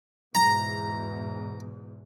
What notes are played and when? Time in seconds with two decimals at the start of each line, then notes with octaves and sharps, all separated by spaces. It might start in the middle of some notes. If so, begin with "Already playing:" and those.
0.35 E2 G#2 B2 A#5